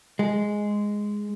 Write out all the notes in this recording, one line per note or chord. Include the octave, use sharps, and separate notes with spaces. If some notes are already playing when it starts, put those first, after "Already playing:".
G#3